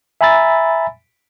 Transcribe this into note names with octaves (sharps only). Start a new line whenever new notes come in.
E5 G#5 A#5 B5 E6 A6